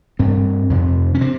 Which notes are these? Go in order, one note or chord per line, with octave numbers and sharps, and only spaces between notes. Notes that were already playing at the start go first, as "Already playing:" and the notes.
G2 C4
F2 C3
C#4
C3 C4